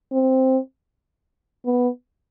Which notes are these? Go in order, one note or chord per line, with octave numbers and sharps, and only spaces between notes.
C4
B3